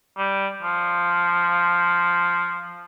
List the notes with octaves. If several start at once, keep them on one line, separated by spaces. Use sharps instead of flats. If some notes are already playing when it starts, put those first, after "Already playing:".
G3
F3